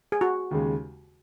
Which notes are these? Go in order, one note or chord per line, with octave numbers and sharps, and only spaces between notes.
G#4
F#4
D#2 C#3 G#3